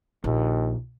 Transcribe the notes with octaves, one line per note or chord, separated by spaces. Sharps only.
A#1 D#2